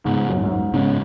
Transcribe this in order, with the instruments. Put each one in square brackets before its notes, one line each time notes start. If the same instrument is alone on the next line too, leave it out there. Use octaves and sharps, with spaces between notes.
[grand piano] G#2 [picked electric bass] C#3 B3
[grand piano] F#2
G#2
F#2
G#2
[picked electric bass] G#2 G#3 B3 [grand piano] C#3